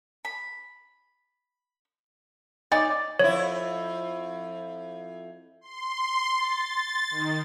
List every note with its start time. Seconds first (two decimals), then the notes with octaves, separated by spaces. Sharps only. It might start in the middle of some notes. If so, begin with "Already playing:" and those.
0.25 B5
2.72 D#4 C#5 D5 G#5 A6
3.19 F2 E4 C#5
5.61 C6
6.37 A6
7.10 D#3